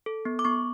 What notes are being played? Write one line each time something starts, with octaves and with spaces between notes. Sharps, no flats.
A4
B3
D6
B3 C#6